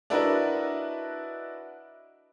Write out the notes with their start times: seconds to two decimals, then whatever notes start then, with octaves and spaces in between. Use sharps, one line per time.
0.10 D4 E4 F#4 A#4 B4 D#5